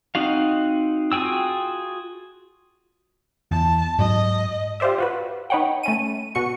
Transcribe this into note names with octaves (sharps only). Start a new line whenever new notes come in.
C4 D#4 F#4 F5
F4 F#4 G#4 G5 E6
E2 A5
G#2 F#3 D#5
F4 G4 C5 D5 E5
F4 F#4 B4
D#4 B4 C#5 F#5 G5
A3 C#4 D#7
B2 F#4 C#6 C#7